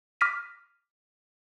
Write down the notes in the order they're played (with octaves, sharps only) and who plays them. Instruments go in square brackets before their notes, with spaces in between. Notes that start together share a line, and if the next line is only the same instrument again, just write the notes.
[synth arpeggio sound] D6 F6 A#6 B6 D#7